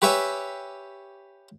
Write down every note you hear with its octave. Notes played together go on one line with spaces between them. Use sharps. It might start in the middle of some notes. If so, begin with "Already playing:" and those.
G4 B4 C#5 E5 G#5